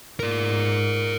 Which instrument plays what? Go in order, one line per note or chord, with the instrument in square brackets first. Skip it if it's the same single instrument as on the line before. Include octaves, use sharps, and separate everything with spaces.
[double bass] G#2 [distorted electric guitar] A#4 D5